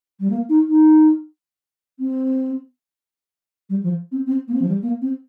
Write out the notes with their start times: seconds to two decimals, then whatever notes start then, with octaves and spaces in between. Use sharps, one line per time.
0.20 G3
0.30 A#3
0.49 D#4
0.67 D#4
1.99 C4
3.69 G3
3.83 F3
4.12 C4
4.26 C4
4.48 A#3
4.54 C4
4.62 F3
4.68 G3
4.82 A#3
5.02 C4